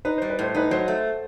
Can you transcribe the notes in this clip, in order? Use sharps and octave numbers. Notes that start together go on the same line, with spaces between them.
D#4 B4
G3 C5
B4
A2 C5
D#4 B4
F#3 C5
A3